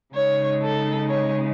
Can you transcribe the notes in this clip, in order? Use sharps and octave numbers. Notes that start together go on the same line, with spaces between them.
C#3 G#3 D#4 C#5
A4
C#5